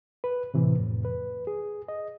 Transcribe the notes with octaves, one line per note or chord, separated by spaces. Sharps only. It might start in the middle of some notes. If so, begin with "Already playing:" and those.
B4
A2 C3 E3
F2 A2
B4
G#4
D#5